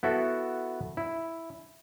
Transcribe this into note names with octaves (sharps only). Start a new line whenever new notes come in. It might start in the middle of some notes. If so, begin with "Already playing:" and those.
B3 E4 F#4 A4 E5
E4